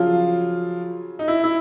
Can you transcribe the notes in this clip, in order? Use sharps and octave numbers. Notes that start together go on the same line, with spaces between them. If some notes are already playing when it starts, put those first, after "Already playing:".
Already playing: C#3 F3 F#3 F4
D#4
E4
E4